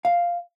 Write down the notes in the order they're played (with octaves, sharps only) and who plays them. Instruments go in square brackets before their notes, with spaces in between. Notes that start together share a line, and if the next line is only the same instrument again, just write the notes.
[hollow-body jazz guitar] F5